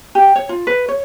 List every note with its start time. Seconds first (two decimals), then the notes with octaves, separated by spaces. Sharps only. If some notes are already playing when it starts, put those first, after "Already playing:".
0.15 G4
0.36 C#5
0.49 F4
0.67 B4
0.88 C#5